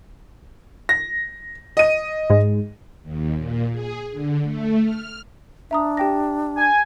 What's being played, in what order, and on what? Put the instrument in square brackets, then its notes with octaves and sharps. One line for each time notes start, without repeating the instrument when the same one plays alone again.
[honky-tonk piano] A#6
D#5 D#7
[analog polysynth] G#2 G#3
[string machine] D#2
A#2
G#4
D3
A3
F6
[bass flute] D4 [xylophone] E5 A#5 D#6
[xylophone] G4 G5 A#6
[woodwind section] G#5